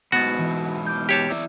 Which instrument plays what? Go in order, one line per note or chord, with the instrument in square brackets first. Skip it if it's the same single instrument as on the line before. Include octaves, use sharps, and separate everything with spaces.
[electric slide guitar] G#2 B2 [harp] B3 A6 [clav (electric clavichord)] F#4
[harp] E3
D6 F6 G6
[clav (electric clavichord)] G4 C#5 A5
[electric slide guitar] E4 D5